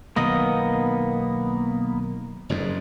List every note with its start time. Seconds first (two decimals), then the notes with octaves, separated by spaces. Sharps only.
0.16 B1 D#3 A#3 B3 D#5
2.49 F#1 F2 G#2